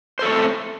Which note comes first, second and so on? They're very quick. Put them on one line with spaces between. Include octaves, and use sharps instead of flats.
C5 A4 C#5 A3 C4